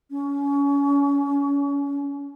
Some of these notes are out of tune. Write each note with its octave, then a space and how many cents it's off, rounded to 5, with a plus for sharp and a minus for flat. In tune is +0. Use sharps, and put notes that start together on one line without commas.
C#4 +30